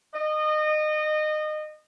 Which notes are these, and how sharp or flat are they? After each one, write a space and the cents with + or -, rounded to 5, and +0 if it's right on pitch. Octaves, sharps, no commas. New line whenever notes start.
D#5 -25